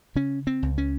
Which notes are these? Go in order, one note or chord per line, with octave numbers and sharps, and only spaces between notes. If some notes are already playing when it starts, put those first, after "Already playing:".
C#3 C#4
C4
C#2
C#4